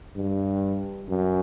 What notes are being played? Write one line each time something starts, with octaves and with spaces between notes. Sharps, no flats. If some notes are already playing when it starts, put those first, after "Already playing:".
G2
F#2